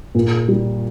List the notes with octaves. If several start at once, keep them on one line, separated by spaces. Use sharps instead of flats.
A#2
G3